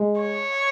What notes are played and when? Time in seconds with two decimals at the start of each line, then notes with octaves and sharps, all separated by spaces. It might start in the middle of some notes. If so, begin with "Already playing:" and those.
Already playing: G#3
0.21 C#5